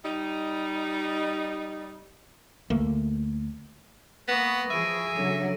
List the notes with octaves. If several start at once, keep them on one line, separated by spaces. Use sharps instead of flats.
G3 D#4
D2 A3 A#3
A#3 B3 B5 C#6 D#6 A#6
E3 F3 G#4 E5 D7 D#7
C#3 F#3 D4 A4 C#5